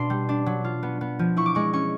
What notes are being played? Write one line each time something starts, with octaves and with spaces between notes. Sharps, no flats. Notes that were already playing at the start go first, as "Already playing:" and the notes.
Already playing: B2 D4 C6
G3
D4
F#3
F4
B3
B3
F3
E4 C#6
D6
G#3 C#6
C#4 C#6